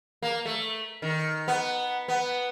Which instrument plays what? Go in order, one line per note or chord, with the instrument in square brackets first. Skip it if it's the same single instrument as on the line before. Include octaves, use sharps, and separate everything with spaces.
[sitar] A#3
A3
D#3
B3
B3